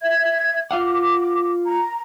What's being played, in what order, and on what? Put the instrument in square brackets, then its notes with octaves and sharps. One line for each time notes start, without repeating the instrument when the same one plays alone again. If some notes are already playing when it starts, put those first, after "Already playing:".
[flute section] E5 G#6
[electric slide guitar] F4 F5 F#5 [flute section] D6
[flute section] A#5